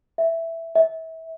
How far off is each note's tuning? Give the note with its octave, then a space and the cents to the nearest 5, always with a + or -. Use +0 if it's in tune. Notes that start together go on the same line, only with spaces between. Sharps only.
E5 +5
E5 -30